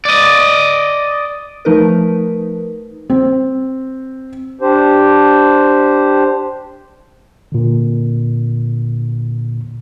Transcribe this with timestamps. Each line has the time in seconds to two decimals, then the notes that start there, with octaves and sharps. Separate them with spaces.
0.05 D5 D#5
1.65 F3 A3 D#4 A#4 B4
3.10 C4
4.61 D4 G4 C5
7.52 A#2 D3